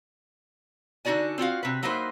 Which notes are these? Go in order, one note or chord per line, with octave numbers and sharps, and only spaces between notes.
D3 D4 D#4 F#4 D5 G#5
C4 F4 F#4 F5
C3 B4
F#3 A#3 D#4 E4 B4 C5